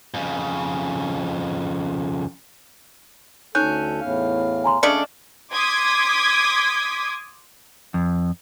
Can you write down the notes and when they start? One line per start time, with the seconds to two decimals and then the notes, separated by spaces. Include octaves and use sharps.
0.14 F2 C#3
3.55 D2 C#4 D#4 A4 F#6 G6
4.01 E2 A2 F5
4.64 G#5 A#5 C6
4.83 C#3 A3 D4 G#4 D5 D#5 C#7
5.54 C6 D6 D#6 G#6 B6
7.94 F2